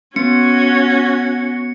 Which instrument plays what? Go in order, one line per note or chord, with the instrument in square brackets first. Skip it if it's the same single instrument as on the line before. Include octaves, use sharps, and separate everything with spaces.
[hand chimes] B3 [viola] C#4 F#4 [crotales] C#7